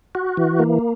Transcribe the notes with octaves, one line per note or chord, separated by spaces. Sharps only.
F#4
E3
A#3